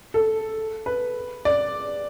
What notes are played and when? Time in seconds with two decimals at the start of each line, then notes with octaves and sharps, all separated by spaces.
0.14 A4
0.86 B4
1.45 D5